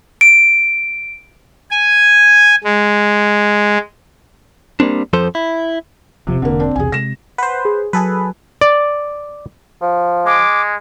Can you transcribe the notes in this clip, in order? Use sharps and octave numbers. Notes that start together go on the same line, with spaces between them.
D7
G#5
G#3
G3 A#3 C4 D4
F2 F3 A4 C5
E4
E1 C3 F3
E1 D3 A#3
C4 D4
B1 E2 C3 G#4 G#5
C3 G#3 A#6 E7
B4 C5 F#5
G#4
F#3 G#4 A4 B4
D5
F3
G#3 D6